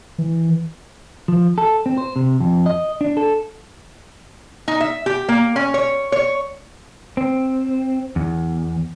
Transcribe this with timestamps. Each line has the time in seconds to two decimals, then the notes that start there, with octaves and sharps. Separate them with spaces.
0.18 E3
1.28 F3
1.58 A4
1.86 C4
1.98 C5
2.16 C3
2.40 F2
2.66 D#5
3.01 D4
3.17 A4
4.68 D#4
4.80 E5
5.06 G4
5.29 A#3
5.56 C#4
5.74 C#5
6.12 C#5
7.17 C4
8.16 E2